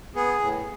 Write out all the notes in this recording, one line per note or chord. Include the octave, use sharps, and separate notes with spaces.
B3 G#4
A2